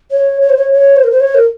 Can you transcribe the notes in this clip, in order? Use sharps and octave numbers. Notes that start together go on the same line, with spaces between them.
C#5
C#5
C5
C#5
C#5
C5
A#4
C5
C#5
A#4